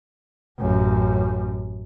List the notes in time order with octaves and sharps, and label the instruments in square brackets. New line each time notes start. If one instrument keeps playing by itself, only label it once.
[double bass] A1 F#2